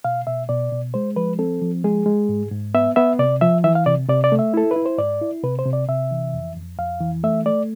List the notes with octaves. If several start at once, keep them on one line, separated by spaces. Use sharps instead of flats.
B2 F5
B2 E5
B2 D5
B2
G#3 C5
F3 B4
C4 A4
F3
G#3 G#4
G#3
G#2
G#2
B3 E5
B3 E5
C3 D5
F3 E5
E3 E5
F5
C3 D5
C3 D5
D5
A3
E5
E4 A4
B4
E4
C5
G#2 D5
E4
C3 B4
C5
C3
D5
C3 E5
E3
F2
F2
F2 F5
E3
A3 E5
A3 D5